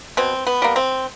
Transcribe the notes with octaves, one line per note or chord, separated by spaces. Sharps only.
B2 C4
B3
G3 A#3
C4